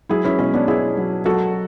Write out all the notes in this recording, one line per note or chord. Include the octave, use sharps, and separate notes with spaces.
F#3 E4 G#4
C#4 E4
B2 C#4
B3 D4
B2 E4 G#4
F#3
F#3 F#4 A4